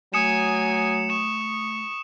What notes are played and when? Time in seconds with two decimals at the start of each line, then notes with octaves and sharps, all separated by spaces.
0.14 F#3 A3 G#5 D#6 C#7 E7
1.10 C#6 E7